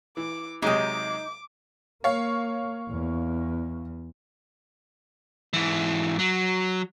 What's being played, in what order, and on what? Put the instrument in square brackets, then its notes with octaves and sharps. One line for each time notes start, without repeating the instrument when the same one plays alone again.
[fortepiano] E3 [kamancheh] D6
[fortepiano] C3 F#3 G#3 [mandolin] D#4 D#6 [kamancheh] D6
[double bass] A#3 [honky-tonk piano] C#5 F5
[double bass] E2
[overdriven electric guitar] G#2 E3
F#3